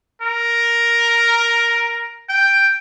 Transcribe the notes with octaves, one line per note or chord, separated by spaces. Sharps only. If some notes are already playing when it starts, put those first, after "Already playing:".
A#4
G5